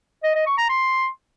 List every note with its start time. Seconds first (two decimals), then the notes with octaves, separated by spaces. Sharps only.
0.24 D#5
0.35 D#5
0.46 C#6
0.58 A#5
0.69 C6